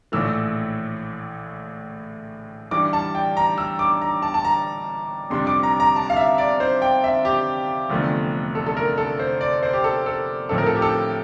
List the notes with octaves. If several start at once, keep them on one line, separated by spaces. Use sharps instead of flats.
A#1 A2 E3 A3 E6
G2 E3 G3 D6
A5
G5
A#5
E6
D6
A#5
A5
A5
A#5
F2 C3 G3 D4 C6
D6
A#5
A#5
A5
F5
E5
D5
C5
G5
E5
G4
F1 E2 D3 F3 A3
A4
A4
A#4
A4
C5
D5
C5
G4
A4
A4
A2 F3 C4 A4
A#4
A4
G4
A4